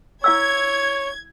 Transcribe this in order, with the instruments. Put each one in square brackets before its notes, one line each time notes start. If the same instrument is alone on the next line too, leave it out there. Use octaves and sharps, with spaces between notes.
[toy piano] E4 F5 E6 [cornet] C#5 [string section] G#6